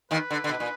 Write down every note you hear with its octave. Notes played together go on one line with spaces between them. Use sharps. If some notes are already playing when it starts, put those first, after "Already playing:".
D#2 D#3 B4
D3
D3
B2
A#2